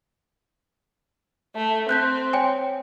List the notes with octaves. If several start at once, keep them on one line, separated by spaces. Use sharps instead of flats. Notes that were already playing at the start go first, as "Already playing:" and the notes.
A3
C4 F#6 G6 B6
C#5 G5 G#5